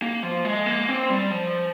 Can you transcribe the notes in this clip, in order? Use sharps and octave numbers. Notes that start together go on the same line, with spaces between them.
A#3
F3
G#3
A#3
C4
G3
F3